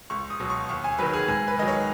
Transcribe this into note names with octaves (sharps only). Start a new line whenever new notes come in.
C#2 C#6
D#6
B2 F#3
C#6
D#2 C#6
G#5
D#3 F#3 B4
G#4
G#2 G#4
B4
D#3 F#3 D#5
C#5